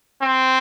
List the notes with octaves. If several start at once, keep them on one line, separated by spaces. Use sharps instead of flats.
C4